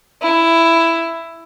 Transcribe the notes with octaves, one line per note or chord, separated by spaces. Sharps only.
E4